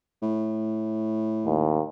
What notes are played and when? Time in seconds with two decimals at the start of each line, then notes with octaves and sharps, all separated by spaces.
0.22 A2
1.46 D#2